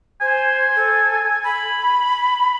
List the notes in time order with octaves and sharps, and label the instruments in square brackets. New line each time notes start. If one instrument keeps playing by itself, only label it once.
[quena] C5 [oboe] G#5
[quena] A4
B5